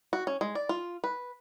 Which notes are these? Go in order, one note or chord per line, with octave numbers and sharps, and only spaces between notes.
F#4
C#4
G#3
D5
F4
B4